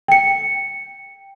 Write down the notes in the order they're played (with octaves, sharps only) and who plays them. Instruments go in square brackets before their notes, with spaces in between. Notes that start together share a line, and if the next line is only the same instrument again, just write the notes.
[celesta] G5 C#7